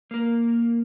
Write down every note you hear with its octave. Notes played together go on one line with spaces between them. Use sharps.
A#3 A#4